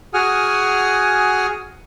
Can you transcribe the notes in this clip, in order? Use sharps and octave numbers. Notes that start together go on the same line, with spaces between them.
F#4 G#4 F#5 G#5 D#6 F6